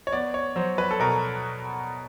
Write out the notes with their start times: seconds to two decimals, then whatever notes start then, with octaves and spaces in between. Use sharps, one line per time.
0.07 C#5
0.13 B3 D5
0.34 C#5
0.56 F#3 C5
0.78 B4
0.91 A4
1.00 B2 A#4